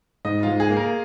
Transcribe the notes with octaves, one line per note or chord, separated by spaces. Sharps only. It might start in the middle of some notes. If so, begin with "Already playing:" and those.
G#2 D#5
G#2 F4
G#4
A#3
A#4